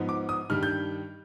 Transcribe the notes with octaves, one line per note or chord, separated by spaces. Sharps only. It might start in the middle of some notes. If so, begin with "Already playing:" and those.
Already playing: G#2 F3 B3
D6
D#6
G2 D#3 G3 F6
G6